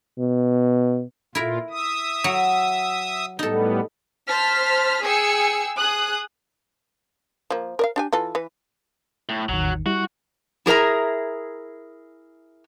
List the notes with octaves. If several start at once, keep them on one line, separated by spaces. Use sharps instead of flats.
B2
A#2 E4 F4 A#4
E5 D#6
F#3
A2 G3 B3 D#4 A4
C5 A5 F6 B6
G#4 G5 G#5 E6 C#7
G#4 D#6 F#6
F3 A#3
A#4 D5 F5
D4 G4 G#5
E3 F4 A4
E3 B4
A2
A1 E2 D#3 F#3
G3 E4 F#4
E4 G#4 A#4 E5 A#5